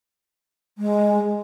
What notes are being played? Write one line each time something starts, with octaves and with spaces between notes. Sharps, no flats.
G#3